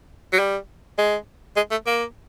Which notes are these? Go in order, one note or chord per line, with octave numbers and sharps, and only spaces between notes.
F#3
G3
G#3
G#3
A3
A#3